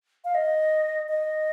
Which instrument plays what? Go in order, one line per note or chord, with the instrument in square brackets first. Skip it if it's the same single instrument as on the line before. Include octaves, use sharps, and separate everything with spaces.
[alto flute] F5
D#5
D#5